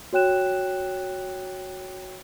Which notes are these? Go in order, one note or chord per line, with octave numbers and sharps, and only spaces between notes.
F#4 C#5 G5 F#6 E7